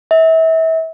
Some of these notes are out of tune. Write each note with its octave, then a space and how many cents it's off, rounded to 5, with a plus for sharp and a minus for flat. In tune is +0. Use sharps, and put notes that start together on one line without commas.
E5 -30